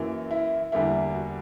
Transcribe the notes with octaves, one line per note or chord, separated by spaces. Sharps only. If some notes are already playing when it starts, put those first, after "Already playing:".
Already playing: F#2 E3 A#3
E4
E2 D3 G3 A#3 E4
F#4